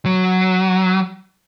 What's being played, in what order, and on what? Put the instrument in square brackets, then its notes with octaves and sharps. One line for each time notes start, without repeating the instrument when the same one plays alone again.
[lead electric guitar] F#3